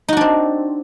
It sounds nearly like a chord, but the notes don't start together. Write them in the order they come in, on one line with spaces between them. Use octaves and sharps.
D#4 F#4 D4 C4